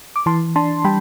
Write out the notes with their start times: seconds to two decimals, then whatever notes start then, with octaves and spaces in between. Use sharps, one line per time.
0.16 D6
0.26 E3 A5 C6
0.56 D4 A5 C6
0.85 G3 G5 B5